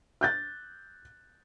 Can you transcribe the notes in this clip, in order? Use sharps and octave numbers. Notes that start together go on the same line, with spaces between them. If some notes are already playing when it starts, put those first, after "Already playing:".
F#6 G6 A6